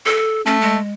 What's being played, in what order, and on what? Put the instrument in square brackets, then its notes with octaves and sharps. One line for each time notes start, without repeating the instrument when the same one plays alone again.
[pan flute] A4
[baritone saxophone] A3 [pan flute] C#4
[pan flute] G#3